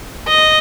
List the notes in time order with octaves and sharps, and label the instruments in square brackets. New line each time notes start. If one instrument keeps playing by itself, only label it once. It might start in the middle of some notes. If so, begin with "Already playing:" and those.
[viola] D#5